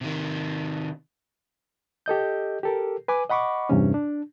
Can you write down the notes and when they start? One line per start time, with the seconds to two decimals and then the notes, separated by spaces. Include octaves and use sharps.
0.01 C3 D#3
2.06 G4 A4 D#5 G6
2.63 G4 A4 A#4
3.08 B4 G#5 D6
3.29 D#5 F#5 B5 C#6 D6
3.69 E2 G2 C3 C#4
3.94 D4